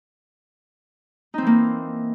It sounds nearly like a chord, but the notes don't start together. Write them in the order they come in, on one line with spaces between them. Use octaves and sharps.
D#4 C4 E3 A#3